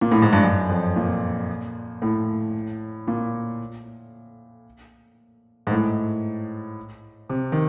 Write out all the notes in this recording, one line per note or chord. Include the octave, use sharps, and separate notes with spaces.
A#2
A2
G#2
G2
F#2
F2
A#2
A2
A#2
G#2
A2
C3
D#3